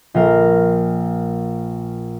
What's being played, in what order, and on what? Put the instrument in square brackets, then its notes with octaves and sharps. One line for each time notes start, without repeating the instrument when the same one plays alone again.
[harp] A#1 F4 A#4